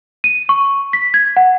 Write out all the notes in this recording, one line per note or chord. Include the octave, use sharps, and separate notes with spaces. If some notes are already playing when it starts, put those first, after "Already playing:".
D#7
C#6
B6
G#6
F#5